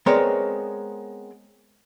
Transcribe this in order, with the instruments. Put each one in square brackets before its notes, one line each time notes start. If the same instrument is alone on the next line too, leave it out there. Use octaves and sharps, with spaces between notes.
[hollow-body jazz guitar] G#3 B3 C4 A#4 C#5 D5